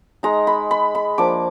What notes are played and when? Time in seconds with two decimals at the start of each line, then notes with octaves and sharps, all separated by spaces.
0.23 G#3 D#4 A#5
0.47 B5
0.71 B5
0.95 B5
1.18 F3 A#3 D4 D6